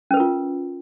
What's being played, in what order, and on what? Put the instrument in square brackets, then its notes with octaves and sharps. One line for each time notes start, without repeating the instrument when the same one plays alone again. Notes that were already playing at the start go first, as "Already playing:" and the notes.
[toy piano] C#4
B4
A#4
F4